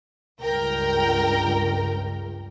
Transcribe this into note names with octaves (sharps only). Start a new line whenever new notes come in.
C#2 G2 A#4 G5